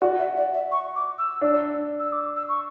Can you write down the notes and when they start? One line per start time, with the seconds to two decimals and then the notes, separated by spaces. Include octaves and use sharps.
0.01 F#4 D5
0.19 E5
0.37 D5
0.54 E5
0.71 C#6
0.95 D6
1.18 E6
1.41 D4
2.00 E6
2.12 D6
2.36 E6
2.48 C#6